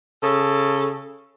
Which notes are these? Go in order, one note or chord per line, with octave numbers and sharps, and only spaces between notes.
C#3 A4